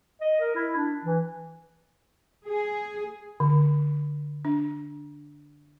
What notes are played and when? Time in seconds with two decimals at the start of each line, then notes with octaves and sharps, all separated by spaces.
0.21 D#5
0.40 A#4
0.55 E4
0.76 D4
1.05 E3
2.47 G#4
3.40 D3
4.45 D4